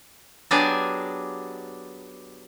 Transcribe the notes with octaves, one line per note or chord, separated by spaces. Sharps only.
F#3 B3 D4 G4 G#4 G#5